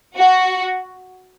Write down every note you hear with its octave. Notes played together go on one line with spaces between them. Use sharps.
F#4